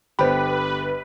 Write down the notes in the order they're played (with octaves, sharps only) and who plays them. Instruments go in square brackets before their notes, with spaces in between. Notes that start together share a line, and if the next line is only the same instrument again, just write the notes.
[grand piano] G1 D3 B3 [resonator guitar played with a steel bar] G4 [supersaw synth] B4 [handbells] C5 B5